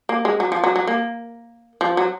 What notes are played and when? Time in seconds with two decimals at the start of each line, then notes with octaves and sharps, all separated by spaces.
0.09 A#3
0.25 G#3
0.40 F#3
0.52 F3
0.64 F#3
0.76 F#3
0.87 A#3
1.81 F3
1.97 F#3